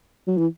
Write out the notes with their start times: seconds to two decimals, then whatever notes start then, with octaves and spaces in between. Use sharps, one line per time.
0.27 F#3
0.37 E3